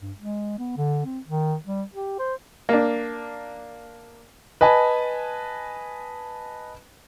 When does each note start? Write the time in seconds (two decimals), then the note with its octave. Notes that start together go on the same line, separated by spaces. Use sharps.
0.02 G2
0.18 G#3
0.58 B3
0.77 D3
1.05 C4
1.28 D#3
1.66 G3
1.94 G4
2.19 C5
2.69 A#3 D4
4.61 B4 D#5 G#5 A5